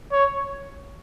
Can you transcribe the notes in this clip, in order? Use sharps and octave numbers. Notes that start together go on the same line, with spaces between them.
C#5